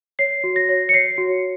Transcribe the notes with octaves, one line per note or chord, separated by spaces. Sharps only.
C#5 C7
F#4
A#6
C#5
C#7
C#5 C7
F#4